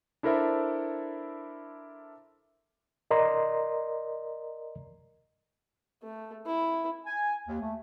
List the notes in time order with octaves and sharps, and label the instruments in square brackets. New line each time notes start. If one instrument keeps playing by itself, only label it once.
[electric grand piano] D4 E4 A4 A#4 C5 E5
[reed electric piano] A#4 D5 D#5 A#5 C6
[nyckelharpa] A3
E4
[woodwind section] G#5
D#2
A3